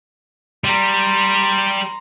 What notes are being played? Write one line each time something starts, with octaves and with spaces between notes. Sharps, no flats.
G3 A#5 C6